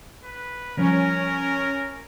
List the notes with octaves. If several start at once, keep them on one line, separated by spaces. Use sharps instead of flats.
B4
F3 G3 C#4 A#4